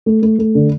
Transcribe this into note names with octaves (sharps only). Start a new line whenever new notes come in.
A3
A3
A3
D3